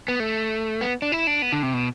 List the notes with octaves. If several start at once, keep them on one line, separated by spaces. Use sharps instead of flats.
B3
A3
B3
D4
E4
D4
B3
D3
C3
B2